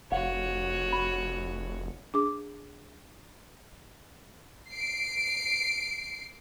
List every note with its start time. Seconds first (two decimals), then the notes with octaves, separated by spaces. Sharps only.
0.12 F1 F#4 C#5 F5 F#5
0.93 B5
2.14 D4 G#4 D6
4.70 C7 D7